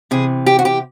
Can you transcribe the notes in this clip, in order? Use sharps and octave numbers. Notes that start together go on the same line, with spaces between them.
C3 E3 G#4
G4
F#4
G4